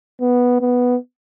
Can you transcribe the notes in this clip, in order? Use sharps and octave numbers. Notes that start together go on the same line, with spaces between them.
B3
B3